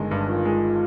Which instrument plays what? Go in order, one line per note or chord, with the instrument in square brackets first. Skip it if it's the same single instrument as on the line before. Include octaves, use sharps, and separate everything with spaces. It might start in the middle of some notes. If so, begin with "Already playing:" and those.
Already playing: [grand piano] G1 D#3 G#3
G2
[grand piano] D#3 [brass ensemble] F4
[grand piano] G#3